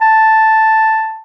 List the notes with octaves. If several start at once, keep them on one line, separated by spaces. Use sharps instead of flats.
A5